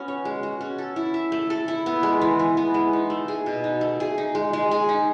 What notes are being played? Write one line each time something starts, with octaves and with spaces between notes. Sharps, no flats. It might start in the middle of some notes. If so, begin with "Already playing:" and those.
Already playing: B3 C#4 F#4
C#5
G#3
F#4
C#4
A4
E4
E5
A3
A4
E4
B3
G#3
E3
E3
B3
G#3
D#4
A3
G#4
B2
D#4
A3
G#4
D#4
G#3
G#3
G#4
D#4